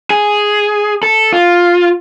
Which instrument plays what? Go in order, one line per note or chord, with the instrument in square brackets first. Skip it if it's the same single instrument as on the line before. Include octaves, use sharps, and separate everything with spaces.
[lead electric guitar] G#4
A4
F4